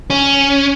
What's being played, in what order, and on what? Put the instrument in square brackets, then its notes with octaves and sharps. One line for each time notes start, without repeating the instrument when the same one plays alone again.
[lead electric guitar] C#4